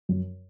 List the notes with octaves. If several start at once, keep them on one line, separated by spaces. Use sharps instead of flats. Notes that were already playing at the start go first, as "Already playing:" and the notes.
F#2